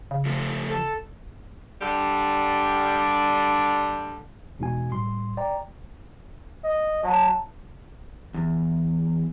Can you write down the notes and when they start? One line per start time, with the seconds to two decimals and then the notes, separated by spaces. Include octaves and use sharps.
0.11 C#3
0.26 F3 A3
0.69 A4
1.81 D3 G3
4.59 E2 B2 G#3 D#4 F#4 G#5
4.92 A2 G3 C6
5.37 D5 G5 A#5
6.64 D#5
7.03 F#3 A5 A#5
8.34 E2